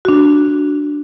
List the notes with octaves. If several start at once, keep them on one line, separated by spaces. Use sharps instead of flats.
D4 F#4